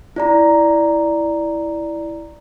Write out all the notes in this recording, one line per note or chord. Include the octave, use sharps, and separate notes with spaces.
E4 D5 A#5